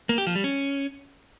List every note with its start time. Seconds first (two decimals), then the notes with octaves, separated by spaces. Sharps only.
0.09 A#3
0.18 G4
0.27 F3
0.35 G3
0.44 C#4